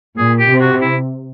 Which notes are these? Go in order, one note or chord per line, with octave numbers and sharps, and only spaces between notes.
A#2 G#4
G4
C3
F#4
E4